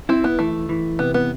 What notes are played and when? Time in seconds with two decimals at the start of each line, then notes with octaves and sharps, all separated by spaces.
0.09 C4 E4
0.24 B3
0.39 E3 A3
0.69 E3
0.99 C3 B3
1.14 B3